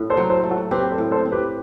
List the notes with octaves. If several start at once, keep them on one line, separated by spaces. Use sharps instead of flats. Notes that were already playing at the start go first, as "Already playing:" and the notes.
Already playing: A2
A4 C5
F#3
A4 C5
A3
F#4 A4
C4 G4 B4
A4 C5
A2
A4 C5
C4
G4 B4